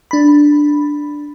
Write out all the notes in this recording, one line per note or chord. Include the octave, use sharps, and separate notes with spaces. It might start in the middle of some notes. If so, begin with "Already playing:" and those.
D4 B5